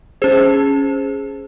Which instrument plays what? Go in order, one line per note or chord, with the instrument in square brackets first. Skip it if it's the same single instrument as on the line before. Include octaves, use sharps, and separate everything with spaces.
[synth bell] C#4 G#4 C5